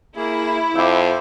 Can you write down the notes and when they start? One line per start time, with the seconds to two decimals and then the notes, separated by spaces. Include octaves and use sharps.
0.17 A#3 E4 G#4
0.75 F2 C5 E5 C6 D6